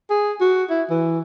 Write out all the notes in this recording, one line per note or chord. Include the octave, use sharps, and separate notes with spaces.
G#4
F#4
E4
E3